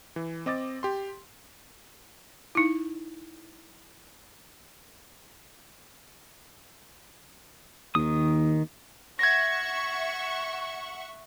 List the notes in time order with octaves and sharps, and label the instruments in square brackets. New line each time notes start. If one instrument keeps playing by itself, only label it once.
[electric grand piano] E3
C4 D#5 D6 A6
G4 C6
[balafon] D#4 E4
[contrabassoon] D#2 [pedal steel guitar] D#3 D#6
[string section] E5 F#5 C#6 [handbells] G#6 A#6